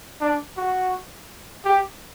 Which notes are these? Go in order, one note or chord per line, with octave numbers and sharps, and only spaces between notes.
D4
F#4
G4